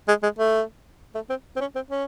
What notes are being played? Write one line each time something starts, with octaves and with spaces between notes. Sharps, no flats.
G#3
G#3
A3
A3
C4
C4
C#4
C4
C#4